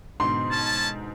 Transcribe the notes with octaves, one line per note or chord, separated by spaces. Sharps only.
G#2 B2 D3 C6
C#4 A5